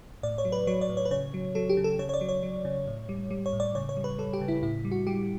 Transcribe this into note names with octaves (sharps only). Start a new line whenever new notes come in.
A2 D5
C#5
F#3
B4
F#3 C#5
D5
A2
C#5
B4
C#3 C#5
F#3
F#3 A4
G4
C#3
A4
C#3 C#5
C#5
D5
F#3
C#5
F#3
C#3
A2
G3
G3
C#5
A2
D5
C#3 C#5
C#5
G3
B4
G3 A4
G4
C#3
E4
A2 E4
G3
F#4
G3 G4